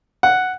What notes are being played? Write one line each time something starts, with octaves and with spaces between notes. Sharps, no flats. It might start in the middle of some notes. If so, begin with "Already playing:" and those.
F#5